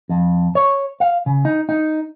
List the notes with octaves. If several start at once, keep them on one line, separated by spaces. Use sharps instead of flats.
F2
C#5
F5
C#3
D#4
D#4